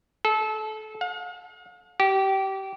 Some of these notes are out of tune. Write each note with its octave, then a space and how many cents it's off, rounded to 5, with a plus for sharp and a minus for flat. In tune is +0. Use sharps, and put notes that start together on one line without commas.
A4 -25
F5 +45
G4 -25